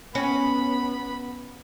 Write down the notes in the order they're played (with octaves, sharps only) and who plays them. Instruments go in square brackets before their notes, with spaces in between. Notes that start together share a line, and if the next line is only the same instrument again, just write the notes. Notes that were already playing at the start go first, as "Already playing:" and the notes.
[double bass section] B3 [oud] C#4 [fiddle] B5